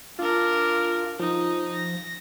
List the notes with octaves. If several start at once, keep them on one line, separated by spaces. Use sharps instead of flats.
D4 F4 A#4
F3 D#4
A#6